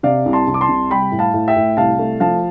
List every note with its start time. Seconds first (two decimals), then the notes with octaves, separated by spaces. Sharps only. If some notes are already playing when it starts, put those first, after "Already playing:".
0.03 C3 D5 F5
0.26 C2
0.33 A5 C6
0.47 C2
0.54 D6
0.61 A5 C6
0.69 C3
0.91 G3 G5 B5
1.12 A2
1.19 F5 A5
1.34 A2
1.48 E5 G5
1.56 A2
1.77 C2 F5 A5
1.99 A3
2.20 F3 F5 A5